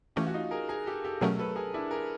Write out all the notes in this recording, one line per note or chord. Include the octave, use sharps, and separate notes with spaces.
E3 A3 C#4 F4 G4
F#4
D#4 F4
G#4 A#4
G#4 A#4
G4 A4
G4 A4
B2 F#3 A3 C#4 G#4 A#4
A4 B4
G#4 A#4
D4 E4
G#4 A#4